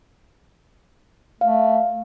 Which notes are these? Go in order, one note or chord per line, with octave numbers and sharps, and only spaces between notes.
A3 F5